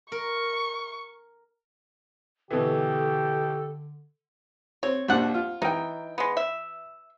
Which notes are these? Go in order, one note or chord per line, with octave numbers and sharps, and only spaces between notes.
A#4 C#6
B2 D3 E3 G4 A4
C4 C#5
A#1 D#2 F3 D4 F#5
F4
E3 D#4 G5
G#3 B3
E5